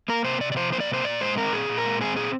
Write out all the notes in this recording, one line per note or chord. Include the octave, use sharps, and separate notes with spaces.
A#3 A#4
C3 C5
C3 D5
D5
F3 C5
A#3 C5
D5
C3 C5
A#2 D5
G#3 C5
C4 A#4
A#2 G#4
A#2
A#4
G#3
C4 G#4
A#2 G#4